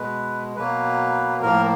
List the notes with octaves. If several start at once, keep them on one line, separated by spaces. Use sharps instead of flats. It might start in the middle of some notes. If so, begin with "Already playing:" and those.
Already playing: B2 G#3 B4
B2 F#3 A#3 B4
A2 F3 A#3 A#4